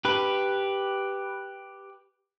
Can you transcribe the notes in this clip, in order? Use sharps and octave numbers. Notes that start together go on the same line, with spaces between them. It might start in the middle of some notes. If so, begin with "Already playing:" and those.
G4 B4